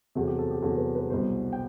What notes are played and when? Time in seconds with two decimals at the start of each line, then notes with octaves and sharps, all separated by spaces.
0.15 E2 C3 F#3 A4
0.27 G4
0.39 A4
0.51 G4
0.62 E2 C3 F#3 A4
0.78 B4
0.95 B4
1.10 C2 B2 F#3 C5
1.53 G5